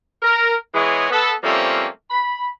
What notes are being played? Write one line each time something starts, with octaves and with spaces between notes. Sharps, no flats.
A#4
E3 G#3 B3 G#4 C#5 D#5
B3 A4
F3 G3 A3 A#3 C4 C#4
B5